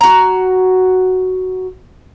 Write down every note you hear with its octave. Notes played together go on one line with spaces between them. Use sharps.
F#4 A#5